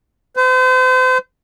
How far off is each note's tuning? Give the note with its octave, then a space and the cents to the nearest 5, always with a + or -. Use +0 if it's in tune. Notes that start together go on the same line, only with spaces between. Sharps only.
C5 -40